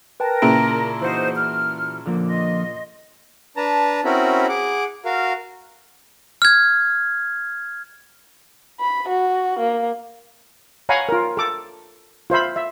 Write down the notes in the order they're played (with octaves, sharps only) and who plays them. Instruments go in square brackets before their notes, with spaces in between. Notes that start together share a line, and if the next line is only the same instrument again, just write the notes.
[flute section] A#4 [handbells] B4 G5 A5
[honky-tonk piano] A#2 C#3 E4 [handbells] A5 A#5 D7
[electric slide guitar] E3 F#4 [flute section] D#4 C5
[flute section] F6
[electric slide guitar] D3 F3 A#3
[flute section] D#5 C6
[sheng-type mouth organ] D4 B4 A5 A#5
C4 C#4 E4 F#4 A#4 B5
G#4 F#5 D6
F#4 A#4 F5
[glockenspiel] F6 G#6
[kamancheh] B5
F#4
A#3
[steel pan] C#5 F5 F#5 G#5 A#5 B5
F4 A#4
A4 D6
F4 C5 E5 B5
E5